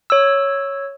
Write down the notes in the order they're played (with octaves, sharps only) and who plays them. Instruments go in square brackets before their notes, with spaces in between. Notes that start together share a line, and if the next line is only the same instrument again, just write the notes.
[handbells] C#5 E6